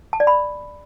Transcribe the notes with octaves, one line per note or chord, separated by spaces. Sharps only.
A5
D5
B5